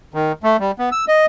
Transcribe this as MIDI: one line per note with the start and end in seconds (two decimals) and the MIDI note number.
0.14 0.32 51
0.43 0.57 57
0.60 0.71 55
0.79 0.89 59
0.92 1.05 88
1.08 1.26 75